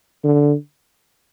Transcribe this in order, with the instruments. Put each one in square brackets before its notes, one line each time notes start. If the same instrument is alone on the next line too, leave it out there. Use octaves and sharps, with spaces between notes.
[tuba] D3